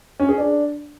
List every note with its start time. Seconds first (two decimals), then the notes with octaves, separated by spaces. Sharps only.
0.20 C#4
0.29 G#4
0.38 D4